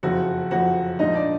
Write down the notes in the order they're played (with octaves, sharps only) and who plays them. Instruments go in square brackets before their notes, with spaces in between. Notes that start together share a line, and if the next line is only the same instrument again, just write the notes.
[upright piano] F#1 F2 F3 F#4 F#5
F#1 F2 F3 F#4 F#5
A#1 G#2 F3 D#4 D#5
D4 D5